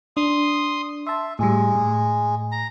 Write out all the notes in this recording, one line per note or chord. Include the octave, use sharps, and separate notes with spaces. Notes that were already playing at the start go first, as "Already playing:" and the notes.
D4 C6 D#6
E5 A5 C6
A2 G3 G#3
A2
A#5